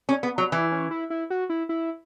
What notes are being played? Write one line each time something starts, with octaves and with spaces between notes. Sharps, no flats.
C#4
B3
F#3
E3 E4
C#4
E4
E4
F#4
E4
E4